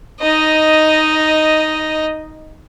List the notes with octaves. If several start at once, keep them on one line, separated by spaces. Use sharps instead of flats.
D#4 D#5